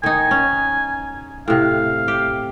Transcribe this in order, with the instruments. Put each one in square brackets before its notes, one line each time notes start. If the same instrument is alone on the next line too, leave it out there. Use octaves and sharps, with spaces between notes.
[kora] D#3 D#4 [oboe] G#5
[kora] C#4
[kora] A2 C3 [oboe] F5
[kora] G4